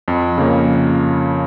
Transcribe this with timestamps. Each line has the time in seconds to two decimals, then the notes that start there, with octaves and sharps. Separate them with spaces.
0.08 F2
0.38 C#3 F3 A#3